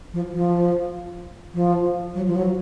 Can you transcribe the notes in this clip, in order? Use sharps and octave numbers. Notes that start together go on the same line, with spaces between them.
F3
F3
F3
F#3
F3
F#3